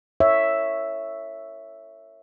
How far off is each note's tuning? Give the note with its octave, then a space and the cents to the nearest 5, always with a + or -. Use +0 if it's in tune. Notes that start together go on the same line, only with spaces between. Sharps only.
A#4 -40 C#5 +0 E5 +0